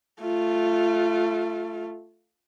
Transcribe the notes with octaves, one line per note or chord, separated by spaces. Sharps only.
A3 F4